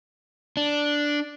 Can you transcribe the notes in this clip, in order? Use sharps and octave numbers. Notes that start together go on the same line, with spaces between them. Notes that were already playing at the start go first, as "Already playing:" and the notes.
D4